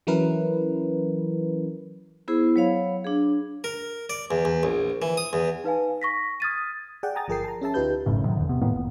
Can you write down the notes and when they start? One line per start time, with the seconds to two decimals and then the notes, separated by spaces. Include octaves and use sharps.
0.07 E3 F#3 C#4 E4 A#4 B4
2.28 B3 E4 G#4 C5
2.56 F#3 C#5 F5 B5
3.05 D4 G#4
3.64 A#4
4.10 D5
4.31 E2
4.45 E2
4.63 A#1
5.02 E3
5.17 D#6
5.33 E2
5.64 D#4 B4 F5 G#5
6.02 C#6 A#6 B6
6.40 D#6 F6 G#6 A6 B6 D#7
7.03 G#4 D5 F#5 G5
7.15 G5 G#5 A#5 D#6 A6
7.28 G1 F3 G#4 A#4 G5 C7
7.44 A5 A#5
7.61 C#4 G#4 E5 A5
7.74 D2 D#4 F4 G4 B4 G6
8.06 G#1 F#2 A2 C#3
8.25 A2 C3 D#3 F#3
8.37 E2 D3
8.49 C3 B3
8.61 A2 D#3 A#3 B3
8.74 F1